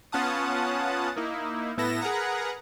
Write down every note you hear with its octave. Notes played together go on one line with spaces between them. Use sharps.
B3 C#4 F4 F#5 A5 D#6
A#3 D#4 E4
A2 B3 E4 A4 A#6 E7
G#4 A#4 B4 F#5 A#5